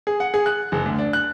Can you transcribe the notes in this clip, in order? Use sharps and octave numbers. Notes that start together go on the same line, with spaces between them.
G#4
F#5
G#4
F#6
F#1
D2
D4
F#6